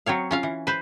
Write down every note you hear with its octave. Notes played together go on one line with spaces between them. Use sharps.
F#3 C4 C#5 F5
C#4 F4 F5
E3
B4 C5